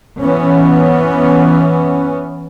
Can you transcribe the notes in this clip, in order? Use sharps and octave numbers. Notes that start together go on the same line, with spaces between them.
E3 B3 C#4